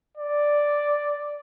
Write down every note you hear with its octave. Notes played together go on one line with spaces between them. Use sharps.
D5